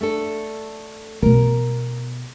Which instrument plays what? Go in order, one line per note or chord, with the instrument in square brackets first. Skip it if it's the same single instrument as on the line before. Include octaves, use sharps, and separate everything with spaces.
[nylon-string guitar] A3 D4 A4
[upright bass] B2 B3 [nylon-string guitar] A#4